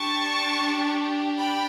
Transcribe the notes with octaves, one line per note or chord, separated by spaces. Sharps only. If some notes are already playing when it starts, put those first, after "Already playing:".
Already playing: D4 G4 A5 C#6
G5 B5